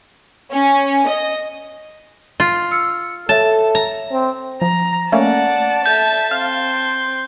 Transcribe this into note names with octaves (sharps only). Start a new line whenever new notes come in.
C#4
D#5
F4
E6 F6 C#7
A4 C#5 E5 A5
A#5
C4
F3 A#5
A3 A#3 C#4 D5 F#5 A5
A4 E5 G6
C4 F5 C6